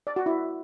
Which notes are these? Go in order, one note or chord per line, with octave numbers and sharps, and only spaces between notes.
D5
F#4
E4